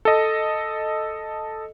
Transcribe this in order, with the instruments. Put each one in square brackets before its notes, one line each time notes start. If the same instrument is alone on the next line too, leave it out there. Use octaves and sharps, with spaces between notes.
[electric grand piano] A4 D#5